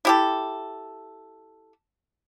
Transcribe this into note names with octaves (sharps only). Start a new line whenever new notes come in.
E4 G4 A4